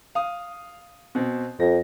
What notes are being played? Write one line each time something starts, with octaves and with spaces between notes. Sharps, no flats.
F5 D#6
B2 C4
F2 A#6